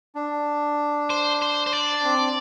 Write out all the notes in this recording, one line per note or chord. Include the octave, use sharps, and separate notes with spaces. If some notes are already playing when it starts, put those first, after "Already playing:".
D4
C5
C5
C5
D5
C4